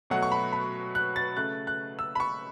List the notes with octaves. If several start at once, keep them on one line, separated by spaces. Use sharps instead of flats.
B2 F#3 A3 F#5
C#6
B5
B5
F#6
A6
C#3 A3 F#6
F#6
E6
B5
C#6